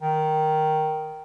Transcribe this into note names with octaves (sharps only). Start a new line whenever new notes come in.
D#3